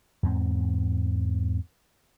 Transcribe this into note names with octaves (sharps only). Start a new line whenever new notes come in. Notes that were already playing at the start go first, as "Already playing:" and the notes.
E2 G#2 A3 C4